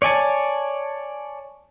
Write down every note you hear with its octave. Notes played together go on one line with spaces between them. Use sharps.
C#5 D5 G#5 A5